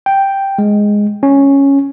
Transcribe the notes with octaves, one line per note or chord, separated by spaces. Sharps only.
G5
G#3
C#4